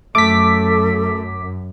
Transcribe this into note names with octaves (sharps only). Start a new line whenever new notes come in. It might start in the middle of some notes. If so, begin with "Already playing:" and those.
F#2 A3 A4 D6 B6